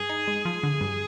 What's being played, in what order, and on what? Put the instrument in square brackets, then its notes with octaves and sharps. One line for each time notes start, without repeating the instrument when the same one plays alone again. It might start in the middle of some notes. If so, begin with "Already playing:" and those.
Already playing: [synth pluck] G2 [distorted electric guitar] G#4
[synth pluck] D#4
G#3
F3
D3
G2